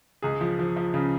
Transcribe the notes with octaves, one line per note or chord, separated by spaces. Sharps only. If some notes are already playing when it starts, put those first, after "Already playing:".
C#2 G#4
F3
F3
F3
C#3